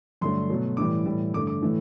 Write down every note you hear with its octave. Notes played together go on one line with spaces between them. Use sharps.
G2 D3 F#3 A3 C6
B2 F#3 A3
A2 E3 G3 D6
A2 E3 G3
G2 D3 A3 D6
D6
A2 E3 A3